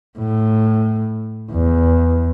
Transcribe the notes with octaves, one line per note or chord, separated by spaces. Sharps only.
A2
E2